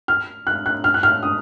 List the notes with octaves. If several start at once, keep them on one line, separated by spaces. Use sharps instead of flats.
F6
F#6
F#6
F6
F#6
F6
D#6